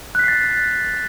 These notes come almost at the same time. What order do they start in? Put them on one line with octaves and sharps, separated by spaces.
F#6 B6 C7 A6